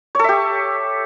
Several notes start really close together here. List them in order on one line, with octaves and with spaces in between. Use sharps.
C#5 A4 E5 G4